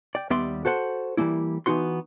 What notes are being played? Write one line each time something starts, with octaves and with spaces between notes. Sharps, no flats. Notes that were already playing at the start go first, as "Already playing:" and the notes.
D5 G5
D#2 G3 B3 D5 E5 C6
F#4 A4 C5 F#5
E3 G3 G#3 A#3 E4
E3 B3 D#4 F#4 C6